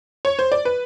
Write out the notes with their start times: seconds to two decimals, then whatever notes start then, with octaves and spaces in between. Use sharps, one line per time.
0.25 C#5
0.39 C5
0.52 D5
0.65 B4